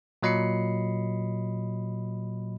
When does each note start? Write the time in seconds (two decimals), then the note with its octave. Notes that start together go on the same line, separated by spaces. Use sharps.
0.23 A#2 F#3 D#5 B5 C7 C#7